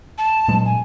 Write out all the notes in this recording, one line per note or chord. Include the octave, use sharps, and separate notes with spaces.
A5
A#2 F#3 G#3
G#5